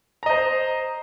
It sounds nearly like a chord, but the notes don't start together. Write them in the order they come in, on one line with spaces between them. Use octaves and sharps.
A#5 D#5 C5